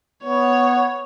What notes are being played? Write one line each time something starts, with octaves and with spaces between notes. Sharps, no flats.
B3 C#5